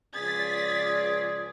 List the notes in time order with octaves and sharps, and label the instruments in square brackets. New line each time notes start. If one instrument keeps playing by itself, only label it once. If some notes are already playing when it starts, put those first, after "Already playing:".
[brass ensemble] C#2 F3 D5 [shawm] G#4 [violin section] A6 B6